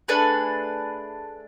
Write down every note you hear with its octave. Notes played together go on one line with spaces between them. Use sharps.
A3 D4 G#4 B4